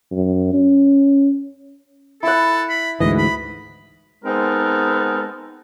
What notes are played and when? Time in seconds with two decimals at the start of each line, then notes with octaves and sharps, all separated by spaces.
0.11 F#2
0.53 C#4
2.23 E4 A4 F#5
2.70 B5
3.00 D2 G#2 E3 D#5
3.18 B5
4.24 G#3 B3 C4 D#4 A4 A#4